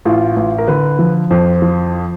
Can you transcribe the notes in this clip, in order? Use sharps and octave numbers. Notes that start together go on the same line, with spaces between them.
A1 F4
A1
A#4
D3 B4
F3
F2 C5
F3